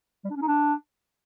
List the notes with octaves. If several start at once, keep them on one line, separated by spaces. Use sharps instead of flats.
G3
D4
C#4
D#4
D4